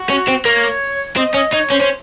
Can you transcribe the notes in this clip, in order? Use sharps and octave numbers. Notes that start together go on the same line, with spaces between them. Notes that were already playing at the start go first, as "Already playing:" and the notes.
Already playing: F#4
C#4
C4
A#3 C#5
C4 D#5
C#4 D#5
D#4 C#5
C#4 C5
C#4